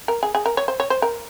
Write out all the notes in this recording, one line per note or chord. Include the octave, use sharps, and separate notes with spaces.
A#4
G#4
G#4
A#4
C#5
C5
C#5
C5
A#4